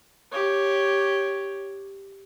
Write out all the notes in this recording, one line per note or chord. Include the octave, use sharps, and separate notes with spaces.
G4 C#5